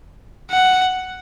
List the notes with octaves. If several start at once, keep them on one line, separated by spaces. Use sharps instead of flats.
F#5